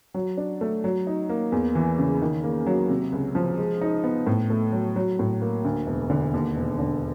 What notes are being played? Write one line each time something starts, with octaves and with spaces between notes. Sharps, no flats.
F#3
D4
A3
F#3
D#4
A#3
E2
E3
C#3
D#3
A#3
F#3
C3
C#2
F3
G#3
D#4
B3
A2
A3
F#3
F#3
A2
A#3
D2
E1
D3
D#2
E1
D3